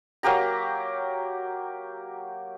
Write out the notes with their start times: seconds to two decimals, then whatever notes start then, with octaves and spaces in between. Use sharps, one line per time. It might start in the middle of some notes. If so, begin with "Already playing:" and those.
0.23 F#3 A#3 G4 A#5